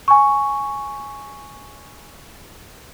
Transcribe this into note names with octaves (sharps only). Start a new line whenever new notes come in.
G#5 C#6